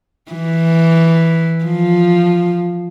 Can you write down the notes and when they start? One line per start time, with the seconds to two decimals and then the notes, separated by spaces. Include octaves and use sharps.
0.31 E3
1.65 F3